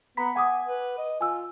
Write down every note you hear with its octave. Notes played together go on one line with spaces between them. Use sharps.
B3 A#5 B5 B6
F#5 G#5 D6 D#6
B4
D#5
F4 G#5 E6